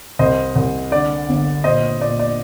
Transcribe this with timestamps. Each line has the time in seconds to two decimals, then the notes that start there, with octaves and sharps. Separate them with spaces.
0.19 C2 C5 D#5
0.56 C2
0.91 D3 D5
1.29 G1
1.64 A#2 C5 D#5
2.01 A#2 D5
2.19 D5